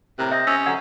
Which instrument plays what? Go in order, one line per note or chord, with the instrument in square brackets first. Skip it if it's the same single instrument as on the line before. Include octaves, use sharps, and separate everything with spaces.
[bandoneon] A2 A#4 F#6 [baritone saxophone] C3
[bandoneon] C5 D#5 [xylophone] E5
[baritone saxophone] C#4 [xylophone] E6 A#6
[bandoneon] D3 F#3 E6 [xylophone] F#5 G#6